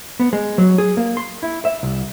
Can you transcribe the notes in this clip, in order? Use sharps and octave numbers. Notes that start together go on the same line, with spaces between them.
B3
G#3
F#3
G#4
A#3
C6
E4
E5
C2